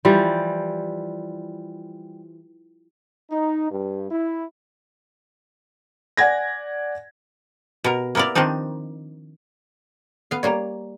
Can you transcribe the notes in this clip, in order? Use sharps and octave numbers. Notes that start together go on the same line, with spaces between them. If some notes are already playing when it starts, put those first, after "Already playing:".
E3 F3 G3
D#4
G2
E4
D5 F#5 G#5 G#6 A#6
B2 A#4
A#3 B3 E4 A#4 D5
D#3 F3 C4 D4 D#4
B3 F5
G3 A#3 C#5 D5 A#5